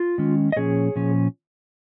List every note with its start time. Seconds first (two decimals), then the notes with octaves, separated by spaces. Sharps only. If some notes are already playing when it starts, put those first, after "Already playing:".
Already playing: F4
0.18 D#3 G#3 C#4
0.52 D#5
0.56 A#2 F3 C#4 G#4 C#5
0.96 A#2 F3 C#4